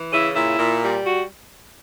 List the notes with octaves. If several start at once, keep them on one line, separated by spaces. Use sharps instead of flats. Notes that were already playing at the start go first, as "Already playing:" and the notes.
Already playing: E3
C#3 E4
A#2 E4
A#2
G3
F#4